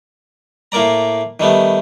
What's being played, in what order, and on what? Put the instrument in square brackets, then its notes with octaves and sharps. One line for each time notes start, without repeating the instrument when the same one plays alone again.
[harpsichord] A2 A#3 A#4 D5 A#5
D#3 G3 A3 B3